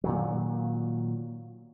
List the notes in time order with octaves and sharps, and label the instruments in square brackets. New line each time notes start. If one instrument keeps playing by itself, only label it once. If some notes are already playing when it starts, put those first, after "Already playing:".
[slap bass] A#2 D#3 F#3